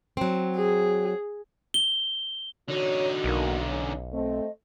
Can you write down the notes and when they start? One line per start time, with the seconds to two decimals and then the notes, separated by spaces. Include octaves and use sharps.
0.17 F#3 C4
0.56 G#4
1.74 G7
2.68 D3 D#4 F#4 C#5
3.24 B1 D#3 A#3
3.68 C#4
4.12 A3 C4 D#5